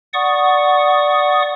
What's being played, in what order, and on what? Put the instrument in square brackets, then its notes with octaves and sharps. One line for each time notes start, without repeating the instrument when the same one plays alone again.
[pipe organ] D5 F#5 C#6 D#6